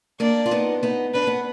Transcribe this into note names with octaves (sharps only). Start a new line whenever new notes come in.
A#3 D4 D5
F4
B3 D#4
B3 D#4
D4 B4
B3